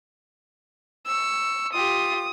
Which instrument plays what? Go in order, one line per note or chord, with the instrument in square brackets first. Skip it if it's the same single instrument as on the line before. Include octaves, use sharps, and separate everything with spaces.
[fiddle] C#6 E6
[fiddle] F4 G4 [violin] D#6